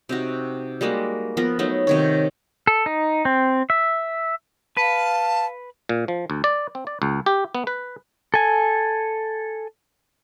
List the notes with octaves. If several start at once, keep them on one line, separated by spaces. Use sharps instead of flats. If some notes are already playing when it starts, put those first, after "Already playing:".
C3 D#4 F#4
G3 G#3 A#3 F#4
F3 B3 A#4
F#3 A3 B3 D#4
C3 D#3 C#5
A4
D#4
C4
E5
B4 F5 A5
A#2
F3
D2
D5
C4
D5
C#2
G4
B3
B4
A4 G#5